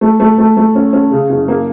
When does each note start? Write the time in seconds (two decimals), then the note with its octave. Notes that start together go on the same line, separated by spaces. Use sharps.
0.01 A3
0.20 A3
0.38 A3
0.57 A3
0.75 C#4
0.93 C#4
1.12 C#3
1.30 F#1
1.48 A#3